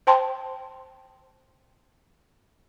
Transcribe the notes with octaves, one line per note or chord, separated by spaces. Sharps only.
C5 G5 A5 C6